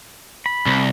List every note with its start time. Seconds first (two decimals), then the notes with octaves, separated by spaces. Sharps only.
0.46 B5
0.66 C2